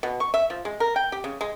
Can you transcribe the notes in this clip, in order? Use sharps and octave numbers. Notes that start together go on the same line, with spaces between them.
B2
C#6
E5
F3
G#3
A#4
G5
G4
C#3
G#3